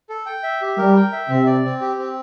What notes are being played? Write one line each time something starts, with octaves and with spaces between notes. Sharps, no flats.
A4
G5
E5
G4
G3 A#4
G5
E5
C3 C4
D5
C4
G4
C4